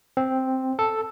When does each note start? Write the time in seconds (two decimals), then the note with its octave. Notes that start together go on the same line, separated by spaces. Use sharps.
0.17 C4
0.79 A4